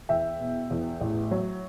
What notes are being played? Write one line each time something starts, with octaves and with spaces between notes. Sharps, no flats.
E2 E5 G5
B2
E2
A1
F#3